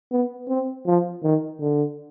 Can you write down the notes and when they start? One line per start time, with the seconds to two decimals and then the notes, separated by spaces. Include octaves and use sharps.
0.12 B3
0.48 C4
0.86 F3
1.23 D#3
1.61 D3